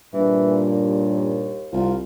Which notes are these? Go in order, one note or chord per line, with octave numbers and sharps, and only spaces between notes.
G2 A#2 E3
D#2
C2 F4